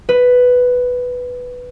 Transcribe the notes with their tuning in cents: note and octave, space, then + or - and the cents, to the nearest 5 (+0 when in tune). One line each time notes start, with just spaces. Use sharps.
B4 +5